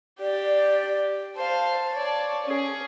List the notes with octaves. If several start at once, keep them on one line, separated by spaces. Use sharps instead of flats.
G4 D5
C5 F5 A5
C#5 D5
C#4 G#4